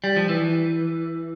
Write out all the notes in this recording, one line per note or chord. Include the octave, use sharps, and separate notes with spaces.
G3
F3
E3